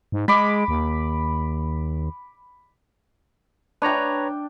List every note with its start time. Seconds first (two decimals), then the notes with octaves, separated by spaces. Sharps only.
0.12 G#2
0.28 G#3 B5 D6
0.68 D#2
3.82 D4 B4 C#5 G5 A#5